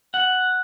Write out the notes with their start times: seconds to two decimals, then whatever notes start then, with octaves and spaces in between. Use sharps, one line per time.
0.14 F#5